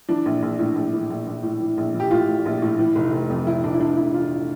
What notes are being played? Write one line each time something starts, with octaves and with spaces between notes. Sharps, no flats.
E3 D4
A#1
A#1
A2
A#1
E3
A#1
A#1
A2
E3
A#1
E3
G4
A2 F4
A2
A#1
A2
E3
F1
F1
F2
E3 E4
F1 D4
E4
E3 D4
F1 E4
E3 F4